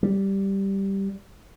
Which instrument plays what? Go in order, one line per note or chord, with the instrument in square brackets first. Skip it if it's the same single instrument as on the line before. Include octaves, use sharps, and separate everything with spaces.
[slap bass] G3